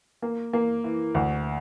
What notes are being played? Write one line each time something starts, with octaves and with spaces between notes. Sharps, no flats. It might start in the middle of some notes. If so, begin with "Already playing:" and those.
A#3
A#3
E3
D2